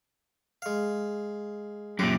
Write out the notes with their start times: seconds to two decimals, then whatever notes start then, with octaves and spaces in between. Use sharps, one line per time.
0.62 G#3 F5
1.99 F#2 A#2 G4